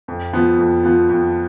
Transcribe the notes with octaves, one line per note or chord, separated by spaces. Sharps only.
F2
F3 B3 F4
F2
F3 B3 F4
F2